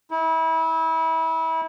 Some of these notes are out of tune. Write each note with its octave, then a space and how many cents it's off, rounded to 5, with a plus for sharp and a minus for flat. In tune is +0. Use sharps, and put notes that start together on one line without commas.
E4 -30